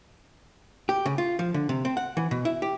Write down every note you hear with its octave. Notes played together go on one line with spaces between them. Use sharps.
G4
C#3
F4
F3
D3
C3
C4
F#5
E3
B2
E4
G4